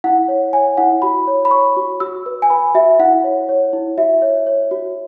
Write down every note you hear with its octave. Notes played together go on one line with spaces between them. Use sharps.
E4 F#5
C#5
C#5 G#5
E4 F#5
F#4 B5
C#5
B5
C#5 C#6
F#4
F#4 E6
B4
G#5
B4 B5
F#4 E5
E4 F#5
C#5
C#5
E4
F#4 E5
C#5
C#5
F#4